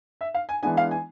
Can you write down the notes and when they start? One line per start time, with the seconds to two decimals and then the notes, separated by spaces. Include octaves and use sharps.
0.21 E5
0.34 F5
0.49 G#5
0.63 E3 G#3 B3 D4 G#5
0.77 F5
0.91 G#5